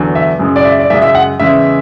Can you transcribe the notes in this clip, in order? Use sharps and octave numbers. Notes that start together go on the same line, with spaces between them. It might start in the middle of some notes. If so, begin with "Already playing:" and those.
Already playing: E2 D3 F#3
E5
F#2 C#3 G#3
D5
E5
D5
F#2 C#3 G#3 E5
E5
F#5
E2 C#3 G#3 E5